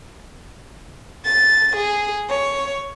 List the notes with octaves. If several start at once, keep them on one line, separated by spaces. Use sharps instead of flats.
A6
G#4
C#5